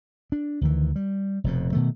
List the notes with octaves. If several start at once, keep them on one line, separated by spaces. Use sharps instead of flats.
D4
D2 D#3 E3
G3
F1 F2 B2
B2 D#3 A3